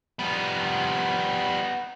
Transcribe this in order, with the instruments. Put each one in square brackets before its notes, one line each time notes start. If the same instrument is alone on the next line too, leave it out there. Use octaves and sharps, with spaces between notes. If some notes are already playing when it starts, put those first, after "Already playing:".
[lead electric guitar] F3 G3 [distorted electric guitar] B3 D#4